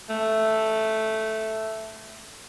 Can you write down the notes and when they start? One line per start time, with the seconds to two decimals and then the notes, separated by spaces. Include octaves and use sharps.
0.09 A3